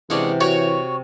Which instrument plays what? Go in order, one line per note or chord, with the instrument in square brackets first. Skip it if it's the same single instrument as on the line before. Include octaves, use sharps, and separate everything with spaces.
[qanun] C3 F5 F#5 [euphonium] E3 [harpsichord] G#3 C#4 D4
[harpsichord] F#4 G5 [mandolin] C#5